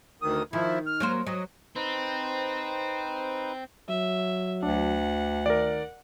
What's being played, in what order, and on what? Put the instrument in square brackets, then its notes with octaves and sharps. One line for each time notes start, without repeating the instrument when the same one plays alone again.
[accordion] D2 D#3 D#6
[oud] D#3 [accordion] F3 E4
[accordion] F6
[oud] F#3 A#3 C5
[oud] F#3 [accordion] D#5
[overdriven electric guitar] C4 [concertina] D#4 B4 C5
[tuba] F#3 [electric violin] E5
[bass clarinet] D2 [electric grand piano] D4 [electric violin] F#5
[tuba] D#3 [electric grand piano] A#4 D5